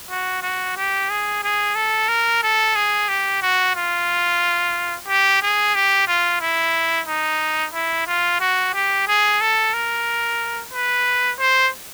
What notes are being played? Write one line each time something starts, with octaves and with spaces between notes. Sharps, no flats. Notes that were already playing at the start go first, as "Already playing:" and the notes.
F#4
F#4
G4
G#4
G#4
A4
A#4
A4
G#4
G4
F#4
F4
G4
G#4
G4
F4
E4
D#4
E4
F4
F#4
G4
G#4
A4
A#4
B4
C5